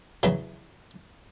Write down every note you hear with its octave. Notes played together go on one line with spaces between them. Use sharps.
E2 C#3 E3 F#3